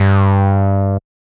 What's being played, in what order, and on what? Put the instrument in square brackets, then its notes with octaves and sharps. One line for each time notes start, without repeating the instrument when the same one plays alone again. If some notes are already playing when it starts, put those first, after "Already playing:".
Already playing: [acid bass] G2